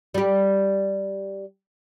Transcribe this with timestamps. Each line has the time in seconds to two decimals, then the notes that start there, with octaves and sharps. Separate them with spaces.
0.14 G3 G4